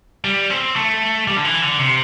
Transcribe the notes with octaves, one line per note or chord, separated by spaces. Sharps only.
G3
C4
A3
G3
D3
E3
D3
C3